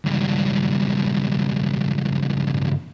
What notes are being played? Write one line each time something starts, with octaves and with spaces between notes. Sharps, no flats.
C#2 G2